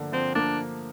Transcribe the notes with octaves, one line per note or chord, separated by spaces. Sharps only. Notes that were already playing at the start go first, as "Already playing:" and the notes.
Already playing: D3 F3 A#3 D4
F3 C4
A#3 D4